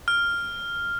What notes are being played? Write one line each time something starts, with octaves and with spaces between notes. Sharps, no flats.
F6